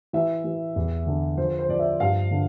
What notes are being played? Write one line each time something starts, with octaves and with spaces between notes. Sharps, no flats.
E3 E5
E3
E2
D3
F3 C5
C5
F3 D5
E5
G2 F5
D3